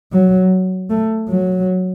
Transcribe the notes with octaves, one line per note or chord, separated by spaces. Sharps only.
F#3
A3
F#3